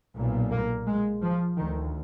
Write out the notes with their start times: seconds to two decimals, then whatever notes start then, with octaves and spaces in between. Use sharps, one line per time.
0.15 B1 A#2
0.51 A#3
0.86 G#3
1.22 F3
1.56 D2 D#3